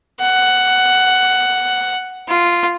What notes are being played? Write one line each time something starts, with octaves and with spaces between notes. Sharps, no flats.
F#5
F4